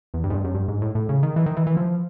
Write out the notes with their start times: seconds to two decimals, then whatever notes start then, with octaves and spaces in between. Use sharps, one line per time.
0.14 E2
0.24 G2
0.30 G#2
0.34 G2
0.44 F#2
0.54 G2
0.68 G#2
0.82 A2
0.95 A2
1.09 C#3
1.23 D#3
1.36 E3
1.46 D#3
1.57 E3
1.67 E3
1.77 F3